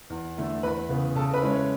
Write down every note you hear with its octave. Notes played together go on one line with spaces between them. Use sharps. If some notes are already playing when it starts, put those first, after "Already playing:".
E2
D3 A3 E4
E2 B4 B5
C#3 E3 B3
C#3 A4 A5
B4 B5
G#3 C#4 E4
C#5